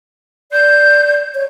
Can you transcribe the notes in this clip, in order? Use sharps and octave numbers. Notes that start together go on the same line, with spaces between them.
D5 G6
C#5